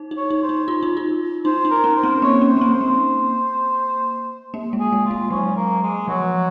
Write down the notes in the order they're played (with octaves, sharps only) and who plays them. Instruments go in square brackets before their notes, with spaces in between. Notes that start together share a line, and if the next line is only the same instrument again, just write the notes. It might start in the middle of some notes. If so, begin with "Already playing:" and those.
Already playing: [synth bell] D#4
D#4
[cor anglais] C#5
[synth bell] D#4
[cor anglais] C5
[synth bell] D#4
F4
D#4
F4
[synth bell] D#4 [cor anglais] C5
[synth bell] D#4
[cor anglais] A#4
[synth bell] C#4
[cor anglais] C5
[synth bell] C4
[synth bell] A#3 [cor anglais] C#5
[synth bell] C#4
[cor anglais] C5
[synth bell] A#3
C4
[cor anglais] C5
[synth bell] A#3
A#3
G#3
[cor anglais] G#4
[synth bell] G#3
[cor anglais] F4
[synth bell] G#3
[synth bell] F#3 [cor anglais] C#4
[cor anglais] A#3
G#3
[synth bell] F3 [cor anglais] F#3